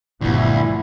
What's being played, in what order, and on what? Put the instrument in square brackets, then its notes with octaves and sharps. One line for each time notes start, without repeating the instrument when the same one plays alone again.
[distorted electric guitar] D2 [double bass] G2 F3 [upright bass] A#2 B3 [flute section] E4